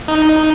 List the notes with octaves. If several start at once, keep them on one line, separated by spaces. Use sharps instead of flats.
D#4